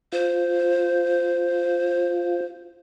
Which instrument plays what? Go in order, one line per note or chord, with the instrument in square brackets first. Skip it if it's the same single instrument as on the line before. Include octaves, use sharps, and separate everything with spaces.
[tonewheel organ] F4 [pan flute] C5